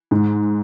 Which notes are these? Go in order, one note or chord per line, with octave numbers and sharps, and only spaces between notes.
G#2